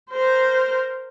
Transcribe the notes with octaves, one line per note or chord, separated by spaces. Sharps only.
A#4 C5